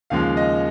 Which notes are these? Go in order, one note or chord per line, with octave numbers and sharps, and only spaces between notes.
D#2 C#3 F3 G#3 F5
D#5